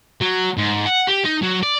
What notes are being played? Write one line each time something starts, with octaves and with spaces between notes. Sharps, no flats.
F#3
G#2
F#5
G4
D#4
F#3
D5